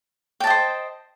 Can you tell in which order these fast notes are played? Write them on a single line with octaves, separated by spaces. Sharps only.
G5 A5 D#5 C5